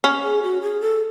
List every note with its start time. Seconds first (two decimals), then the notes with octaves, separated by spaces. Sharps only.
0.04 C#4
0.23 G#4
0.43 F#4
0.62 G#4
0.81 A4